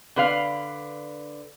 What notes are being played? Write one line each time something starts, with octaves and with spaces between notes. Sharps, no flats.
D3 B4 F5